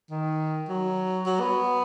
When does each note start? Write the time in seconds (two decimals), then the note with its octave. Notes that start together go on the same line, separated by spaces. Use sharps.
0.10 D#3
0.68 F#3
1.26 F#3
1.40 B3